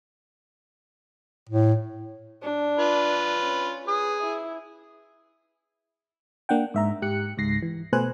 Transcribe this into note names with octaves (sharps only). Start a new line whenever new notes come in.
A2
D4
F4 B4
C#4
G#4 B4 D#6
E4
A#3 D4 F#5 G5
G#2 E5 A#5
G#2 G4 F#6 C#7
C#2 G#2 A#6 C7
E3
B2 A3 B4 C5 G#5 F#6